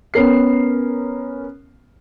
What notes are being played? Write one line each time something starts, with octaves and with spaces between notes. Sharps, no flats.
B3 C#4 A#4 C7